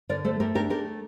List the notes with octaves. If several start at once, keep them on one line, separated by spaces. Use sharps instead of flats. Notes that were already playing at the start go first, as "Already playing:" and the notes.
D3 A#4 D5
A3 A4 C5
A3 G4 A#4
D4 G4 A#4
A3 G4 A#4